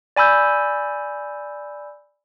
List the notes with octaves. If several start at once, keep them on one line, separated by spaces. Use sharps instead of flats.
D5 G#5 B5 E6 G6